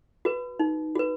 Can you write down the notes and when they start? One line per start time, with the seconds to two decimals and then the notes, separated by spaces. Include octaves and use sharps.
0.25 F#4 B4
0.59 D#4
0.95 F#4 B4